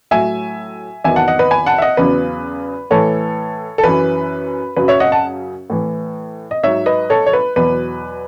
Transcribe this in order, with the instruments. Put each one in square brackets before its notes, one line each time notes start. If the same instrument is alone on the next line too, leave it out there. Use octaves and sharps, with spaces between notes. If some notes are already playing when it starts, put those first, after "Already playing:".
[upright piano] A2 F#3 E5 G#5
E2 D#3 F#3 E5 G#5
F#5 A5
D#5 F#5
B4 D#5
G#5 B5
F#5 A5
E5
D#5 F#5
E2 C#3 F#3 B4
A2 E3 A4 C#5
A4
F#2 E3 B4
F#2 C#3 F#3 B4
C#5 E5
D#5 F#5
F#5 A5
A2 E3
D#5
G#2 F#3 C#5 E5
B4 D#5
A4 C#5
C#5
B4
E2 B2 F#3 B4